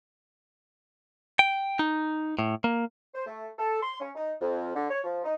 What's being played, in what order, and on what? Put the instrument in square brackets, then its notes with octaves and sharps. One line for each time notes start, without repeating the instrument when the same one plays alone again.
[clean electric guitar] G5
D#4
A2
A#3
[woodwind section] C5
A3
A4
C6
C#4
D#4
F2
D3
C#5
F3
D#4